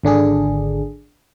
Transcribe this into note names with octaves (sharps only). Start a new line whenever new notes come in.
G#1 D3 D4 G#4